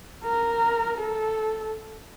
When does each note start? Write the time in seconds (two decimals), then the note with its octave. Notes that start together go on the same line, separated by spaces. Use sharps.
0.24 A#4
0.98 A4